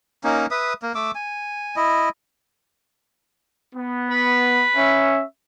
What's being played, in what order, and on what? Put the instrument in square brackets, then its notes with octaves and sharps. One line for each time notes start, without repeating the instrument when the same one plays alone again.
[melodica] A#3 C#4 D#4
B4 E5 D#6
A#3
A3 D6 E6
G#5
E4 D#5
[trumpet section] B3
[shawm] B4
[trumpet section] C#4 E5